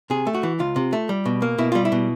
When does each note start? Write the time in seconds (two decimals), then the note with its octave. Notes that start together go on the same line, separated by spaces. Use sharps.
0.10 C3 G#4
0.27 A3
0.34 F#4
0.43 E3
0.59 C#2 F4
0.76 C3
0.93 A3
1.09 G3
1.25 B2
1.42 A#3
1.58 B2 E4
1.72 G3 F4
1.85 E4
1.92 B2